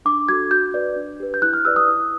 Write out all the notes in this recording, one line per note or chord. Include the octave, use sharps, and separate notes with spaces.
D4 D6
F#4 A4 G#6
F#4 G6
B4 D5
D4
G4 B4
G6
E4 F#6
F6
G4 B4 D5 E6
D#6
E4